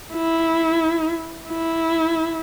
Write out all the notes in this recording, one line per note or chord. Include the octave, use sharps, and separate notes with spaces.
E4
E4